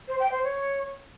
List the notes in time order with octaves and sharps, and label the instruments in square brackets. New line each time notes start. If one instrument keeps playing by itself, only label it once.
[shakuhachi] C5
G5
C5
C#5